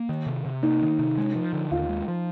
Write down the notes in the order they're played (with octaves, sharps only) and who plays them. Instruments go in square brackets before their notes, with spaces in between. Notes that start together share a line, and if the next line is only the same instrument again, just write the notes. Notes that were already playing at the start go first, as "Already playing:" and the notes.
Already playing: [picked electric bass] A#3
D#3
C3
C3
[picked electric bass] A#3 [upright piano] D#4
[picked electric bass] D#3
C3
G#3
F3
D3
[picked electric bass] D#2 [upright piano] F4
[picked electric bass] G#3
F3